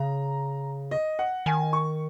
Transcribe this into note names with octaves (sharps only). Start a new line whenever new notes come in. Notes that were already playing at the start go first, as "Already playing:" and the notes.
Already playing: C#3 A#5
D#5
F#5
D#3 G#5
C#6